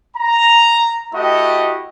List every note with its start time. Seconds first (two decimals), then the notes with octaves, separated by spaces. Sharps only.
0.16 A#5
1.14 A3 E4 F#4 G4 D#5